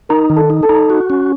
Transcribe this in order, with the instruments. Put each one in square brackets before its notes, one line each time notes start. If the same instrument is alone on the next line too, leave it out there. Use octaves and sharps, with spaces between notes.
[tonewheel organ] D#4 [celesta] A#4 A#5
[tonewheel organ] D#3
[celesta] A4 A5
[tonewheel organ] D#4
[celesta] A4 A5
[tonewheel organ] D#4
F#4
C#4